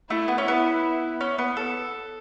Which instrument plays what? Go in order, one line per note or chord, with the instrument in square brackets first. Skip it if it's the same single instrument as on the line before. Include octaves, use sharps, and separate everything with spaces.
[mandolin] A3 [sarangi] E4
[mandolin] B3
C#4
[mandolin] B3 [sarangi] E4
[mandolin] C#4
B3
A4